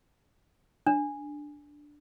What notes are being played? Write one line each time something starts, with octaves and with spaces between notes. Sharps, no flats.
D4